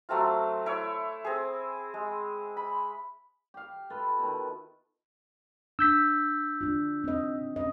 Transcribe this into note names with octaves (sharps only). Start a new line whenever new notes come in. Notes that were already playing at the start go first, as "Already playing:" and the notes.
F#3 A3 C4 F4
E4 C#5
C4 G#4
G#3
B5
G4 F5
E4 F4 A4 B4
B2 D#3
D4 E6 G6 B6
D4 F4
C4 D#5
C#4 D#5